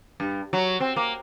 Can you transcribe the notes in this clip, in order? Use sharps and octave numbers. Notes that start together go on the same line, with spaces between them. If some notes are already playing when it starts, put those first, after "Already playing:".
G2
F#3
C4
A#3